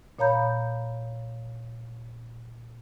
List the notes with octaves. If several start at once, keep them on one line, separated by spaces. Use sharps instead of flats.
A#2 C#5 F5 A#5 B5 G6